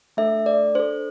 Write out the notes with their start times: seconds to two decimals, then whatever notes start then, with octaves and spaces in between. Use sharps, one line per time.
0.17 A3 D4 A4 E5
0.46 D5
0.75 D4 A4 C5